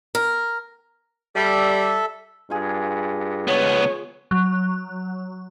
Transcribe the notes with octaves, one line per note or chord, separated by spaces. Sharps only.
A#4
G3 A4 E5
G2 F4 G#4
C#2 B3 C#5
F#3